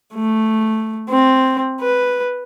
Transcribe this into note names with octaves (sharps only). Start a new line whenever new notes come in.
A3
C4
B4